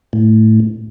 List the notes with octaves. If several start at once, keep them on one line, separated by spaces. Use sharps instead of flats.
A2